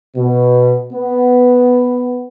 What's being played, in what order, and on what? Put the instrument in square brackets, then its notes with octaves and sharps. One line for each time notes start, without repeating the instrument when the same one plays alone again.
[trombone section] B2
B3